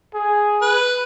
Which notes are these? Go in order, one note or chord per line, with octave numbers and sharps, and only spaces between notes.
G#4
B4